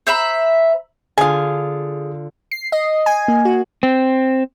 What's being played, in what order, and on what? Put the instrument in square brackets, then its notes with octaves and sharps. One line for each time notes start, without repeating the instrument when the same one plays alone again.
[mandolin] C5 E5 A#5 B5
[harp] D3 F4 [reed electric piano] G#4 D#6 [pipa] F5 G#5
[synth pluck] C7
D#5
G#5
A#3
F#4
[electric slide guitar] C4